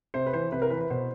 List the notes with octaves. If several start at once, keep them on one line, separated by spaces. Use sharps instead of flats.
C3 C5
B4
E3 C5
C3 B4
A#4
E3 B4
B4
B2 C5